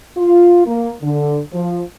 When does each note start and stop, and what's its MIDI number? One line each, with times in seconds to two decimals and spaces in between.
0.17 0.66 65
0.66 0.92 58
1.02 1.40 50
1.52 1.82 53